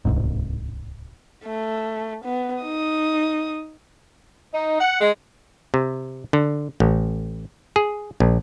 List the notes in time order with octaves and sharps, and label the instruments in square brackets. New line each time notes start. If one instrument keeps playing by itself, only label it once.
[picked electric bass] D1 C2 G#2
[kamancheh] A3
B3
D#4 D#6
[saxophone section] D#4
F#5
G#3
[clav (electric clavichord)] C3
D3
A1
G#4
A#1